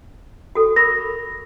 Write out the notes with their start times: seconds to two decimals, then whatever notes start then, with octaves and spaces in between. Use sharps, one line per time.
0.55 F#4 A4
0.76 A#4 B5 C#6 A#6